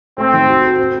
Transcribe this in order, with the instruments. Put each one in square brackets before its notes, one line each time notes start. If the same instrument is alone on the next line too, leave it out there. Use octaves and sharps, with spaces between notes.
[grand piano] A3 [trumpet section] C4
[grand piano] D#3
F#4
A4
C4